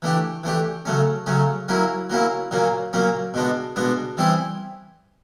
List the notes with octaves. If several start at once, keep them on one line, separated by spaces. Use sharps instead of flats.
E3 A3 D4 G4
E3 A3 D4 G4
C#3 F#3 A3 C#4
C#3 F#3 A3 C#4
F#3 A#3 C#4 E4
F#3 A#3 C#4 E4
A#2 F#3 A#3 C#4
A#2 F#3 A#3 C#4
B2 G#3 B3 D4
B2 G#3 B3 D4
E3 G3 C4 E4 G#4